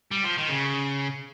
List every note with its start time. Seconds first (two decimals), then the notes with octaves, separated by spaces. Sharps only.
0.11 G3
0.24 F3
0.38 D#3
0.50 C#3